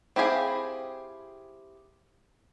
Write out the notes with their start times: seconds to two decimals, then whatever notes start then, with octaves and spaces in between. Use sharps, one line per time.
0.16 C4 E4 G4 G#4 F5